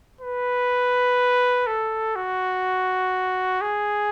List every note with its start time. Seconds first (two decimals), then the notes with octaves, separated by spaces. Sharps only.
0.21 B4
1.67 A4
2.16 F#4
3.61 G#4